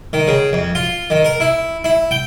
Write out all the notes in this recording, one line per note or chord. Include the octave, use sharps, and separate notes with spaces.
D#3
C#3
F2
F4
D#3
A#4
E4
E4
G5